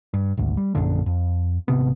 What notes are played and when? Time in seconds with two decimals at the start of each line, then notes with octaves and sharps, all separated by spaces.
0.14 G2
0.37 G#1 D2
0.57 G3
0.75 A#1 F#2 D3
1.06 F2
1.68 G#1 C3 B3